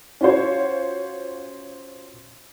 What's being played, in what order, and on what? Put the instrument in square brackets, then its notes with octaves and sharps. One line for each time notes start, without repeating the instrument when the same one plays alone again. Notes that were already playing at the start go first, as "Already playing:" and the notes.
[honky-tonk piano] C#4 F4 F#4 C5 C#5